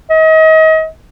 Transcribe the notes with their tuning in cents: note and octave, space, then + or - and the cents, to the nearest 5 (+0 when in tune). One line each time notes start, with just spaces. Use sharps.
D#5 +35